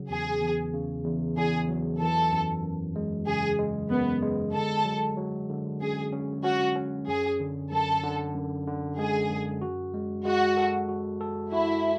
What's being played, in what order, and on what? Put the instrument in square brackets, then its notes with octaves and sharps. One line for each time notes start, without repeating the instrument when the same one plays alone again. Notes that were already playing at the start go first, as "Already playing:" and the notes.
Already playing: [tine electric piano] C#3 F#3
[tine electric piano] E2 [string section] G#4
[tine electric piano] E2
C#3
E2
[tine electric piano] E2 [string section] G#4
[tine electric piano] F#3
[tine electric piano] E3 [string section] A4
[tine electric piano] F#2
F#2
G#3
[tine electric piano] C#3 [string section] G#4
[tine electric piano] G#3
[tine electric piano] F#2 [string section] B3
[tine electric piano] G#3
[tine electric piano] D3 [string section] A4
[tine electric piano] F#3
F#3
D3
[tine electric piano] C#4 [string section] G#4
[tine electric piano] C#4
[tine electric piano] C#4 [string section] F#4
[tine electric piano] C#4
[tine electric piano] F#2 [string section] G#4
[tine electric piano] D3
[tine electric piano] F#2 [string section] A4
[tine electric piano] D3
F#2
D3
[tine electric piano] G#3 [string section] G#4
[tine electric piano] F#2
F#4
G#3
[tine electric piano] G#3 [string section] F#4
[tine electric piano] A4
F#4
A4
[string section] E4 [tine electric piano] F#4